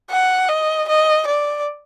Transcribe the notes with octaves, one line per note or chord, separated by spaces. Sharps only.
F#5
D#5
D#5
D5